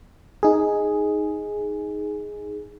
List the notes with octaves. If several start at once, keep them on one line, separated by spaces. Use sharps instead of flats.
D#4 G#4